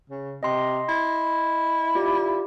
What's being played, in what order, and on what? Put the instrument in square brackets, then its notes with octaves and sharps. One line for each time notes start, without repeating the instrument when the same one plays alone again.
[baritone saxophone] C#3
[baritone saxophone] C3 [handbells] D#5 C6
[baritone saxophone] E4
[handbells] F4 G4 D5